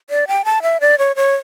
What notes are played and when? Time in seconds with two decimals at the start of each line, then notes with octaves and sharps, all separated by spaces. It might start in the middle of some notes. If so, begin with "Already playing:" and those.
0.10 D5
0.28 G5
0.45 A5
0.62 E5
0.81 D5
0.98 C#5
1.16 C#5